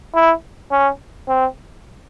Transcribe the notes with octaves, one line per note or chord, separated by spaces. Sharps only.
E4
C#4
C4